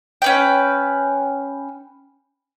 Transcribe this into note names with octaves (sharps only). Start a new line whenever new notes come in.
C#4 B4 G5